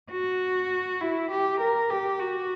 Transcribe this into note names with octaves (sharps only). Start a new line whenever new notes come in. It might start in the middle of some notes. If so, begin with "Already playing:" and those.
F#4
E4
G4
A#4
G4
F#4